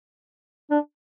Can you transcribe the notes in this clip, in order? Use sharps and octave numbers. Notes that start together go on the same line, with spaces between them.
D4